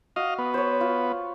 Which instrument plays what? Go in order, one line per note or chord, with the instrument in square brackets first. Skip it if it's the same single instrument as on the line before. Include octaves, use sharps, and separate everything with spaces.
[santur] F#4 [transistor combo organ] D#5 F5
[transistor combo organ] B3
[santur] C5 C#5
F4